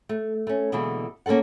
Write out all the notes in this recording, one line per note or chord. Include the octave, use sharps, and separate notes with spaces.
A3
A3 C#4
B2 D3 E3 G#3 A#3 B3
A#3 C#4 F#4 A4 F#5